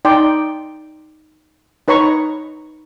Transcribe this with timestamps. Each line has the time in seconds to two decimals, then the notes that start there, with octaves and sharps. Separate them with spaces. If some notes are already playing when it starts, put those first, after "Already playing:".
0.05 D#4 D5 G5 C6
1.88 D#4 B4 C#5 A#5 C#6